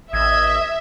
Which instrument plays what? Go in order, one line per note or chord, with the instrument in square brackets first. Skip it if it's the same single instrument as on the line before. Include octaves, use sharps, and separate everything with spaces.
[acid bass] A1 [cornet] D#5 [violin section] E5 [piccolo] G#6